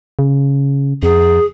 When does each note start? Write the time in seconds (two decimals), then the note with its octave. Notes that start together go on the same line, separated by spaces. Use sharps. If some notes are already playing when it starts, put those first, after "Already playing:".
0.19 C#3
1.03 F2 G#4